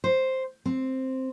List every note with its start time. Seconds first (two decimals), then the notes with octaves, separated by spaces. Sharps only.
0.04 C5
0.66 C4